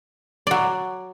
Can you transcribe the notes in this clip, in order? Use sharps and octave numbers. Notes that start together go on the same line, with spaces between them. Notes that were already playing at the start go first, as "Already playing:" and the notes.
F#3 D5